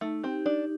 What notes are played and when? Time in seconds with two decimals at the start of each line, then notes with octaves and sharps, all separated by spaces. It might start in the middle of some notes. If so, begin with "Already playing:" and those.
0.01 A3 D#4
0.24 C4 G4
0.46 D4 D#4